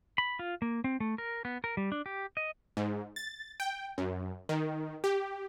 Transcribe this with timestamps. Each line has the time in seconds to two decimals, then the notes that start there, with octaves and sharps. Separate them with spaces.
0.18 B5
0.39 F4
0.62 A#3
0.84 C4
1.00 A3
1.18 A#4
1.45 B3
1.64 A#4
1.77 G3
1.92 D4
2.06 G4
2.37 D#5
2.77 G#2
3.16 A6
3.60 G5
3.98 F#2
4.49 D#3
5.04 G4